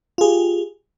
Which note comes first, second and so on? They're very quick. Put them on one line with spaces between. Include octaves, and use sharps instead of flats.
F4 G#4 G4